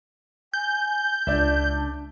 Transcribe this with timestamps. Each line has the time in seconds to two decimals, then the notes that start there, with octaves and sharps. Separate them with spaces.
0.53 G#5 G6
1.27 C#2 D4 D5 E5